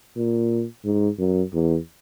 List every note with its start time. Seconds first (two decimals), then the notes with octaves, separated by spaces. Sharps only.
0.17 A#2
0.85 G#2
1.19 F#2
1.54 E2